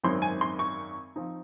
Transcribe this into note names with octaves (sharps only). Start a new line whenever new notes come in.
G#1 F#2 D#3 F#3 C4 C6
G#5
C6
C#6
F3 C4 D#4